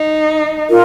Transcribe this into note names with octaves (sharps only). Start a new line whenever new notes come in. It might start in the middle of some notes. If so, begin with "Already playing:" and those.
Already playing: D#4
F4 A#4